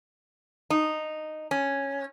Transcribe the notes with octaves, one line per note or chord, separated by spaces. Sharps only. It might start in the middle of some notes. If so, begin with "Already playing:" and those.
D#4
C#4